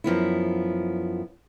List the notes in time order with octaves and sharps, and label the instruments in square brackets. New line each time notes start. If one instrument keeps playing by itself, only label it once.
[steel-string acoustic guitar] F#2 F3 B3 E4